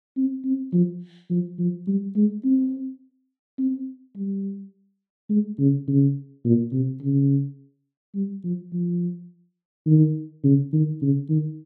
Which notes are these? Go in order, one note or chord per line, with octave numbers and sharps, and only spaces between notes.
C4
C4
F3
F3
F3
G3
G#3
C4
C4
G3
G#3
C#3
C#3
A#2
C3
C#3
G3
F3
F3
D#3
C#3
D#3
C#3
D#3